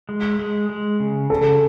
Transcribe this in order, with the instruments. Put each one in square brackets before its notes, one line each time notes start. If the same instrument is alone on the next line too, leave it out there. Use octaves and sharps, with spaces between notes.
[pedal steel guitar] G#3
G#3
G#3
C#3
[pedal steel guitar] C#3 [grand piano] A4